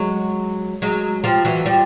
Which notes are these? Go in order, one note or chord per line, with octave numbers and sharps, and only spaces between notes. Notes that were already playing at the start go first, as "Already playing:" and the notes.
Already playing: F#3 G#3
F#3 G#3
F3 G3
E3 F#3
F3 G3